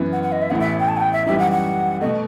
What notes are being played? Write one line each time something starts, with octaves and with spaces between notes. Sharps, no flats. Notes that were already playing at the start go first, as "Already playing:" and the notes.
Already playing: F#2 E3 B3
F#5
F#5
D#5
E5
A1 A2 E3 B3 F#5
E5
G5
A5
F#5
G5
E5
F#2 E3 G3 D#4 E5
F#5
F#5
B2 A3 D#5